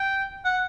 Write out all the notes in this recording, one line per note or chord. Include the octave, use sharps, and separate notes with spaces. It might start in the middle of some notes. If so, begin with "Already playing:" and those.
Already playing: G5
F#5